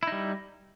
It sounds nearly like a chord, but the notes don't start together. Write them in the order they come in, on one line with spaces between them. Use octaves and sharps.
E4 D#4 G3